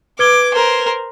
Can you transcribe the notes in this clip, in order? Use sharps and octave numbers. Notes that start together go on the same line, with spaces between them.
B4 D6 G#6 G7
A#4 C5